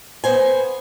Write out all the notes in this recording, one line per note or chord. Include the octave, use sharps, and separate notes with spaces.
B3 C5 G#5